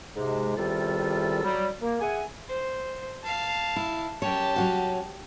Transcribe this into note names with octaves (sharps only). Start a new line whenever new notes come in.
G#2 C3 G#3
E2 C3 D#3 G3 F4 A4
F#3 G3
A#3
G#4 E5 F#5 G#5
C5
F5 A5
E4
F#2 G4 C#5 A5
F#3 C#4 F#4